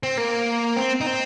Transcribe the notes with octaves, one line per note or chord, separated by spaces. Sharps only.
C4
A#3
C4
D#4
C4